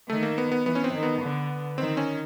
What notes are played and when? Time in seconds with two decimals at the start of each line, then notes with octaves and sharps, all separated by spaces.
0.09 D#3 A3
0.23 A#3
0.38 B3
0.52 B3
0.65 E3 B3
0.75 C#4
0.84 C4
0.94 D#3
1.03 B3
1.22 D3
1.78 D#3 C4
1.97 C#4